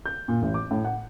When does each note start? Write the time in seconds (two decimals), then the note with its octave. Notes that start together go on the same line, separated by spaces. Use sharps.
0.06 G6
0.28 A#2
0.42 A1
0.54 D6
0.71 A2
0.84 F#5